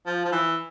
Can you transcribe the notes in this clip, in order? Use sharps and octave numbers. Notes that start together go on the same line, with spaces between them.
F3
F3
E3